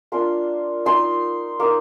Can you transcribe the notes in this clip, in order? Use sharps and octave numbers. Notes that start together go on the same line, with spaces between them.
A#3 D4 F4 C6
A#3 D#4 C6
A#3 D#4